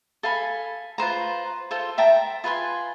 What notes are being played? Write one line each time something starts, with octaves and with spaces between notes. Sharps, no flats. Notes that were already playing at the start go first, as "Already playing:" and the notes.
A4 F5 G#5 B5
F4 B4 C5 A#5
F4 A4 C5
E5 G5 A5 A#5
F4 B4 G#5 C6